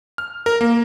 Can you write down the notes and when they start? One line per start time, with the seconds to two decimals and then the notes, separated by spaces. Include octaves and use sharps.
0.18 F6
0.46 A#4
0.61 A#3